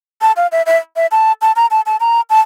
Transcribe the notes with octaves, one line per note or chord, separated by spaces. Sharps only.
A5
F5
E5
E5
E5
A5
A5
A#5
A5
A5
A#5
A5